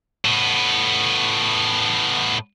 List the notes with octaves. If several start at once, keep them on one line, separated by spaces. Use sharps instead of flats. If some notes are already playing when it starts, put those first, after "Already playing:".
A2 B3